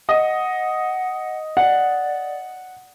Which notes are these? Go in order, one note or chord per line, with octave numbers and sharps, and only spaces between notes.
D#5 F#5
D5 F#5